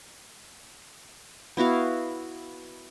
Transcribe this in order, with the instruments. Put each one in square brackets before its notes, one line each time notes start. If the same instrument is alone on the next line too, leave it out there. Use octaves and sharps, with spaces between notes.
[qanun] B3 E4 F#4 F5